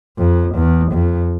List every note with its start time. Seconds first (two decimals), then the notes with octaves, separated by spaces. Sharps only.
0.19 F2
0.55 E2
0.92 F2